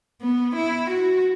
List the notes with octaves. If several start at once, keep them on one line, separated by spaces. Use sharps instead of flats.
B3
E4
F#4